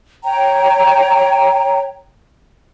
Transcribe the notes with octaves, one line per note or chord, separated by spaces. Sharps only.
C#5 G5 A#5